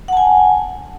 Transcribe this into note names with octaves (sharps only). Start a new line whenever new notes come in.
F#5 G#5 A5